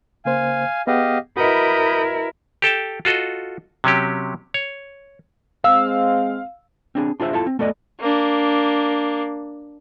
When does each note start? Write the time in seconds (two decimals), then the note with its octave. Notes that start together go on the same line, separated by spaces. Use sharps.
0.25 C#3 A#3 C5 F5 G#5
0.87 B3 G4 G#4 D#5 F5 F#5
1.37 E4 F#4 A#4 B4 D#5 B5 D#6 G6
2.62 G4 A4 G5 A5
3.05 F4 F#4 A4 D#5
3.84 C3 F#3 C#4 G4
4.54 C#5
5.64 G#3 C4 F5 E6
6.95 C4 D4 G#4
7.20 D4 F4 G#4 C5 E5
7.33 E4 F4 A4 A5
7.46 C4
7.59 A3 B3 A4 D5 D#5
8.00 A#3 D4